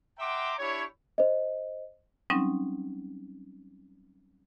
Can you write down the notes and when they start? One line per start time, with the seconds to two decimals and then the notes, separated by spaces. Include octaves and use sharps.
0.18 E5 F#5 G5 A#5 C6 D6
0.58 D4 E4 G4 C#5
1.18 C5 D#5
2.30 F#3 G3 C4 C#4 D#4